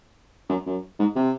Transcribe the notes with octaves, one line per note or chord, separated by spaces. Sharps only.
F#2
F#2
G#2
C3